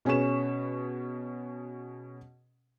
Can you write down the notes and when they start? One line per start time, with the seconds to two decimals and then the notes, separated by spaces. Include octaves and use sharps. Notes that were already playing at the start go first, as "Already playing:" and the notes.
0.05 B2 C#4 G#4 B4 C#6 E7